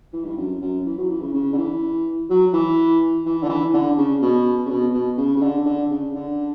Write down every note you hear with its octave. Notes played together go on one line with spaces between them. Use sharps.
E3
G2
F#2
F#2
E3
F#3
E3
C#3
C#3
D3
E3
F#3
E3
E3
D3
E3
D3
C#3
B2
C#3
B2
B2
C#3
C#3
D3
D3
C#3
D3